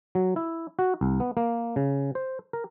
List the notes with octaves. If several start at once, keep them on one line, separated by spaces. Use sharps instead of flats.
F#3
E4
F#4
C2
B3
A#3
C#3
C5
A#4